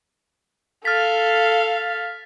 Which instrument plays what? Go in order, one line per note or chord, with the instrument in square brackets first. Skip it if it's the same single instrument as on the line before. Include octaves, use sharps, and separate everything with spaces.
[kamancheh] A4 F5 [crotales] F6 A6 B6